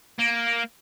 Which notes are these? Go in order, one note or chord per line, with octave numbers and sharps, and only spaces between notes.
A#3